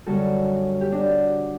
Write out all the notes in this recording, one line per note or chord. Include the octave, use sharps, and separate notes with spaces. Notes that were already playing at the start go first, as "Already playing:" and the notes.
F#2 D3 G3 F#4 A4
G4
D4 F#4